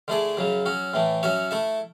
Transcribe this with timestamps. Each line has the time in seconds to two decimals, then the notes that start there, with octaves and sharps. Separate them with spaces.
0.08 D3 A3 E4 G#4 D5
0.37 F#2 C#3 F#3
0.66 F#3 C#4 F#4
0.93 A2 E3 A3
1.23 F#3 C#4 F#4 C#5 E5
1.51 A3 E4 A4 E5